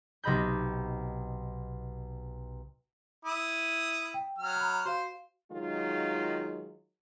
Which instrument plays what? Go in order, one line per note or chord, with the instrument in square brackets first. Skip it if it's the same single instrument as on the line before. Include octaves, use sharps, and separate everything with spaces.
[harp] B1 C3 D#5 B5 G6
[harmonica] E4 D#6
[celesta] G5
[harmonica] F#3 F6
[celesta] A#5 B5
[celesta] F#4 F5 [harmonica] C5
[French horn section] D#3 F#3 G#3 F4